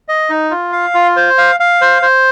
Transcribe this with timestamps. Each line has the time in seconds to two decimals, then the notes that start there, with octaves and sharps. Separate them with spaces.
0.08 D#5
0.30 D#4
0.51 F4
0.72 F5
0.95 F4
1.16 C5
1.38 F5
1.60 F5
1.81 C5
2.02 C5